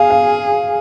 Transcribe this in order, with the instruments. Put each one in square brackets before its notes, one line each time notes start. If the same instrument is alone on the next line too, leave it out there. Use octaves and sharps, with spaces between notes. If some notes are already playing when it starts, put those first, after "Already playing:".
Already playing: [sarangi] G#4 [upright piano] F5
[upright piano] F5